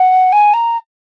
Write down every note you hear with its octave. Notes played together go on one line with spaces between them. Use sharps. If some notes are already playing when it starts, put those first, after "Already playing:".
Already playing: F#5
G#5
A#5